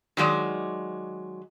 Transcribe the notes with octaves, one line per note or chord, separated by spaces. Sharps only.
D#3 F#3 G#3 D5